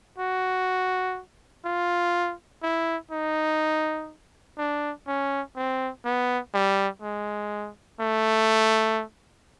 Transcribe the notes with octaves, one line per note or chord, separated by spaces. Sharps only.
F#4
F4
E4
D#4
D4
C#4
C4
B3
G3
G#3
A3